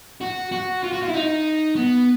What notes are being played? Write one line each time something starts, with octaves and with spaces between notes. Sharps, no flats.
F#4
F#4
F4
F#4
F4
E4
D#4
B3